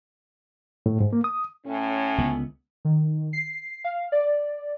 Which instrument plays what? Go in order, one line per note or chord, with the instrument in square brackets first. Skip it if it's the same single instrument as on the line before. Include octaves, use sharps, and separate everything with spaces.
[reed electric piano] A2
G#2
A#3
D#6
[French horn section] A2 C#4
[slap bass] C#2 D3 B3
[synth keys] D#3
C7
F5
D5